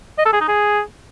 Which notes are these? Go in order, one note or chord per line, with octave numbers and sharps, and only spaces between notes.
D#5
A4
G#4
D#4
G#4